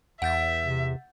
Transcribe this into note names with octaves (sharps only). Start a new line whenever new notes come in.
E2 E5 F#5 G6 A6
C3